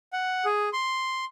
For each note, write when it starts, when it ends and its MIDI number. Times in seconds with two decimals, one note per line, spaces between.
0.13 0.45 78
0.45 0.69 68
0.73 1.25 84